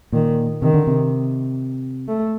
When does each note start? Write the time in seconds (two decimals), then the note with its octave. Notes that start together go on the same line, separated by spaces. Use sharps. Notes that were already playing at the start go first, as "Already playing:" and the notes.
0.12 A#2 D#3
0.62 C3 D#3
0.74 D3
0.87 C3
2.08 A3